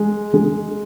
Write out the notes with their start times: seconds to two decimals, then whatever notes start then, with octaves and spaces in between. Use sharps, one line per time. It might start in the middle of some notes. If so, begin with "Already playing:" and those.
Already playing: G#3
0.34 G#3